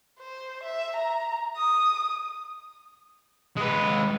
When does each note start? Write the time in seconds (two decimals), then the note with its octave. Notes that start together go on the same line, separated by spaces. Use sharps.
0.20 C5
0.64 E5
0.97 A#5
1.57 D#6
3.57 G#3 B4